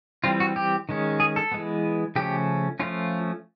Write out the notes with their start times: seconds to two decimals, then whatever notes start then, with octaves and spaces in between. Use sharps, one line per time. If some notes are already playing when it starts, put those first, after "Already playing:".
0.24 E3 G3 C4 F4
0.40 F#4
0.56 G4
0.89 D#3 G#3 C#4
1.20 G#4
1.36 A4
1.51 E3 G#3 B3
2.16 C#3 F3 A3 C#4 G4
2.80 F3 A3 C#4 F4